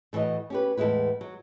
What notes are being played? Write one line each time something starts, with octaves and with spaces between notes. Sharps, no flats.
A2 E3 F#4 C#5 D#5
C#4 G4 B4
E2 A2 G#3 E4 B4
F#3